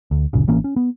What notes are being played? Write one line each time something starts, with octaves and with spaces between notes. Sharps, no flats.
D2
F#1 D2 A#2 C#3
A1 E3 A#3 C#4
C#4
B3